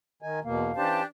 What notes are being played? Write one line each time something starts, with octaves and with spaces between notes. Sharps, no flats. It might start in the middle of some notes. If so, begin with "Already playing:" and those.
D#3 D#5 G#5
E2 B2 A#3 F5
E3 C#4 D4 G4 C5 A5